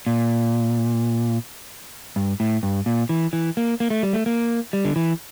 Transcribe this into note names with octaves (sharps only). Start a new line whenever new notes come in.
A#2
G2
A2
G2
A#2
E3
E3
A#3
A#3
A3
G3
A3
A#3
G3
D3
E3